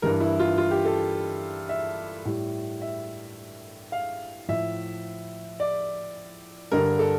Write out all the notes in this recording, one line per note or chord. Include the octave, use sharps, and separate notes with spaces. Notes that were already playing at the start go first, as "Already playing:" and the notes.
G2 E3 G3 A#4
E4
F4
F4
G4
A4
E5
A2 G3
E5
F5
A2 F3 E5
D5
G2 D3 G3 A#4
A4